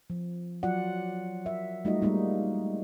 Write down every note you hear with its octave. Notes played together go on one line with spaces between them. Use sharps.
F3
F#3 F4 D5 F#5
A#4 E5
G3 A3 D#4 F4 F#4 D#5
G3 G#3 A#3 D#4